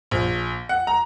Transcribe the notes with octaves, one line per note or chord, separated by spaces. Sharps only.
A#1
F#5
A#5